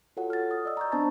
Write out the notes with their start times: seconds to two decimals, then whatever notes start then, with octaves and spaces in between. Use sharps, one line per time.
0.17 F4 F#4 A4 C#5 F#5
0.30 F6 A6
0.51 D#6
0.65 D5 D#5 E6
0.77 A#5 C#6 G6
0.92 B3 C4 D4 C5 A5 A6